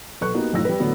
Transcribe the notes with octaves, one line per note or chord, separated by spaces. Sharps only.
B1 A4 B4 C#6 F#6
A#3 B3 D#4 F#4 G4
F#1 A2 D#4 F4 E6 A#6
G3 B4
A2 D3 F#3 B3